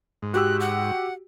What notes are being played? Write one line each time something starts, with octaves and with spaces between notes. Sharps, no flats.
G#2
F#4 G4 E6 F#6
F#5